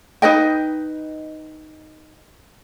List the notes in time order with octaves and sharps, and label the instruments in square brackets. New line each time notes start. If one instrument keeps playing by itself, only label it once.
[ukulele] D#4 B4 D#5 G5